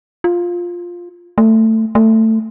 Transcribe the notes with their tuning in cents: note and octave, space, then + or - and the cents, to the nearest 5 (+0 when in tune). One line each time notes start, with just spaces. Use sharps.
F4 +5
A3 +15
A3 +15